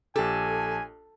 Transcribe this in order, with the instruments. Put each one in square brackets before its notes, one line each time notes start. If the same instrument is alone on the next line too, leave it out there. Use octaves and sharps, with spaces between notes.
[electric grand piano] A#1 G4 [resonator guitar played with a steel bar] A4 [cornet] G#5